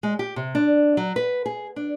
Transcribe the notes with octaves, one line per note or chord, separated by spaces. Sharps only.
G#3
G4
C3
D4
F#3
B4
G#4
D4